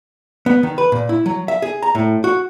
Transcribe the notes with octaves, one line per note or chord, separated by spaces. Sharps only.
B3
D#3
B4
A#2
E4
F#3
E5
G#4
A#5
A2
F#4